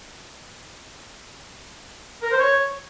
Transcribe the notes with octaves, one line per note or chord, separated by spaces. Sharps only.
A#4
C5
C#5